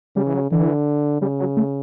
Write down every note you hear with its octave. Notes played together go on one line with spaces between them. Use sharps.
C#3 G3
E3
F#3
D3 E3
C#3 G3
F#3
A3